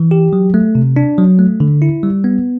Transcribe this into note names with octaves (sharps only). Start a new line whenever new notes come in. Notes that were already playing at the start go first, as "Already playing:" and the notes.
Already playing: E3
G4
F#3
A3
C3
D4
F#3
A3
D3
E4
G3
B3